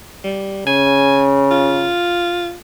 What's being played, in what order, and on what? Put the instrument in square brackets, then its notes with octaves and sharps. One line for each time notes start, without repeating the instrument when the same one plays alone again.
[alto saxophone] G3
[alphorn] C#3 [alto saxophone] G#5
[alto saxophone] F4